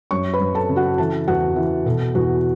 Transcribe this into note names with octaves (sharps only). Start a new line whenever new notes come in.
F#2 C#5 C#6
B4 B5
F#2
A4 A5
C#3
F#4 F#5
E3 A4 A5
E2 F#4 F#5
E3
B2 A4
E2 F#4